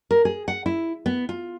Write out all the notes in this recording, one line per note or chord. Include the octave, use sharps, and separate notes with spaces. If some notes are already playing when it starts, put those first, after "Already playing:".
A#4
G#4
F#5
E4
B3
F4